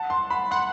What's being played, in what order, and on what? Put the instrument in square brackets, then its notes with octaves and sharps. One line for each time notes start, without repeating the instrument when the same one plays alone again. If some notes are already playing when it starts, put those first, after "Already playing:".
Already playing: [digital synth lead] F#5 [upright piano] A5
[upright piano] C6
B5
[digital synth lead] F#5 [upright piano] C6